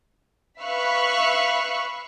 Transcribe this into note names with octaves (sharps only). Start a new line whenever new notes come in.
B4 E5 F5 B5 C#6 F#6